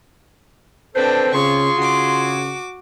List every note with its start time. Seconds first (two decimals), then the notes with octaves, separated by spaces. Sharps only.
0.95 C4 D4 A4 B4 C5
1.34 C#3 F4 G#4 C6 C#6
1.78 C#3 F#4 D6